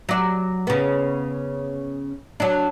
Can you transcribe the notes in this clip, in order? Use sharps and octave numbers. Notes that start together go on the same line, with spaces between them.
F#3 D5
C#3 B3
F#3 D4